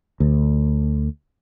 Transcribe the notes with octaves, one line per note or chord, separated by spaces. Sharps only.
D2